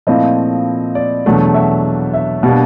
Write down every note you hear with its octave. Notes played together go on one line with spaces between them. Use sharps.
A#2 F3 A3 C4 E4 D#5
D5
E2 B2 F#3 A3 D4
E5
E5
B2 G3 A#3 D4